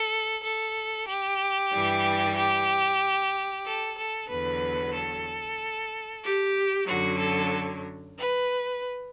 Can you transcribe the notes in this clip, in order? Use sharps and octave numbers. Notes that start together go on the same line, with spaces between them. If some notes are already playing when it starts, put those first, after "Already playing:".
Already playing: A4
A4
G4
G2 E3 G3
G4
A4
A4
E2 D3 F#3 B4
A4
G4
F#2 D3 F#3 F#4
A4
B4